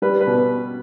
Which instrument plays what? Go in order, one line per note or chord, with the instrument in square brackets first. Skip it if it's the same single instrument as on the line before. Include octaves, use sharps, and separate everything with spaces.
[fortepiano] G3 B4
B4
B2